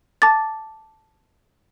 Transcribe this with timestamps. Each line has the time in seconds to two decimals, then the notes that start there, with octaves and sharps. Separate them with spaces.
0.22 A5 D6 A6